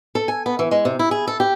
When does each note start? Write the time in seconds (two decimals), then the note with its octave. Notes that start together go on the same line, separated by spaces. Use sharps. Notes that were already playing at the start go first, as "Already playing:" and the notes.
0.15 A4
0.28 G#5
0.46 B3
0.59 E3
0.71 G#3
0.85 C3
0.99 E4
1.11 G#4
1.27 A4
1.40 G4